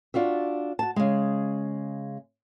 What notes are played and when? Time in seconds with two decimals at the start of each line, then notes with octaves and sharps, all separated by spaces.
0.14 D4 F4 F#4 E5
0.79 F#4 A5
0.96 C#3 G#3